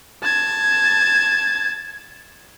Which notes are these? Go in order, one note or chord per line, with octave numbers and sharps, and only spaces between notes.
A5 G#6